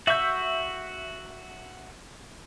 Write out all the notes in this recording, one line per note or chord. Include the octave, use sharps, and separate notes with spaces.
F#4 E5 C#6 E6 G6